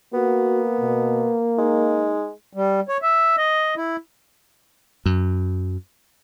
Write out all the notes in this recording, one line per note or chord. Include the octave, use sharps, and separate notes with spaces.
A#3 B3 F#4
B2
G#3 D#4
G3
C#5
E5
D#5
E4
F#2